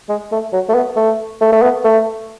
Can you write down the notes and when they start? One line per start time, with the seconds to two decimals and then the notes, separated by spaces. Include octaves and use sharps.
0.09 G#3
0.32 A3
0.53 F#3
0.69 A3
0.74 B3
0.96 A3
1.41 A3
1.52 A3
1.62 B3
1.84 A3